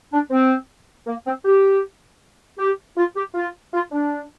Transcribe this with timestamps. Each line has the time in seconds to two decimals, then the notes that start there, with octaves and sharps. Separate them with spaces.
0.12 D4
0.31 C4
1.07 A#3
1.26 C4
1.45 G4
2.58 G4
2.97 F4
3.16 G4
3.35 F4
3.73 F4
3.91 D4